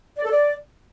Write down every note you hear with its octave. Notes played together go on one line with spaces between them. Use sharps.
D5
A4
D5